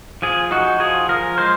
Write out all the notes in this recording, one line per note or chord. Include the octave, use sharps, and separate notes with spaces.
F3 G#4
D#4 F#4
F3 G#4
F3 A#4
G#3 C5